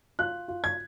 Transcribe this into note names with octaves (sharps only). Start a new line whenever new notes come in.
F4 F#6
F4
G#6